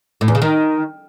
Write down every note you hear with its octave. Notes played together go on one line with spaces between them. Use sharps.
A2
E2
C#3
D#3